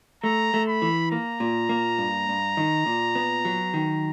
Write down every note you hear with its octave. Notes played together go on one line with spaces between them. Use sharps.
A3 A#5
A3
B5
E3
A#3 A#5
A#2
A#3
G2
G2
D#3
A#2
B3
F#3
D#3